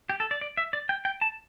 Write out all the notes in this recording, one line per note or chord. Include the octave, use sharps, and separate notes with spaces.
G4
A4
D5
D5
E5
D5
G5
G5
A5